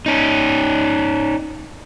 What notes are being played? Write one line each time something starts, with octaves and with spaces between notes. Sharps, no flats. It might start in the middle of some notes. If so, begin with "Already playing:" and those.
C#4 D#4